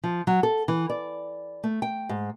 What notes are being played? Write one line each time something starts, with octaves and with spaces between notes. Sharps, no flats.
F3
F#3
A4
E3
D5
A3
G5
G#2